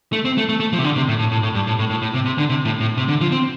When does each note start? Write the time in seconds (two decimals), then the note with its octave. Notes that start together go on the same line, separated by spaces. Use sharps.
0.13 A3
0.25 C4
0.38 A3
0.49 A3
0.60 A3
0.73 F3
0.78 C3
0.84 D3
0.96 C3
1.08 A2
1.19 A2
1.32 A2
1.43 A2
1.55 G2
1.67 A2
1.79 A2
1.90 A2
2.02 A2
2.14 C3
2.25 C3
2.38 D3
2.49 C3
2.65 A2
2.80 A2
2.97 C3
3.09 D3
3.21 F3
3.32 C4